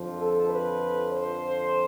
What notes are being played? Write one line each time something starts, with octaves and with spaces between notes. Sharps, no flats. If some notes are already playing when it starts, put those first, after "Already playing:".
Already playing: F2 D3 F3
A4
B4
C5